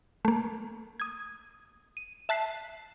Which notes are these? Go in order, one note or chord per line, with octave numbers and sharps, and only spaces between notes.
A3 A#3
D#6 G#6
D#7
E5 A5 F#6 B6 C7